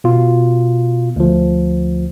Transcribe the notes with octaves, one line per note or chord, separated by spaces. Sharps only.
B2 F4
D2 F3